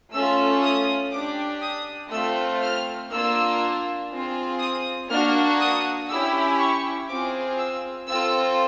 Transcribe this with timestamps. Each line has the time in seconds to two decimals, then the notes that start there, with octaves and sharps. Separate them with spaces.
0.12 A3 C#4 F4 E6
0.62 D#6
1.12 D4 G4 D6
1.61 D#6
2.11 A3 C4 F4 E6
2.61 F6
3.11 A#3 D4 F4 E6
4.11 C4 F4 G#4
4.60 D#6
5.10 A#3 D4 F#4 F6
5.59 D#6
6.09 C#4 E4 G4 E6
6.59 C#6
7.09 C4 F4 G#4 D6
7.59 E6
8.08 C4 F4 A4 E6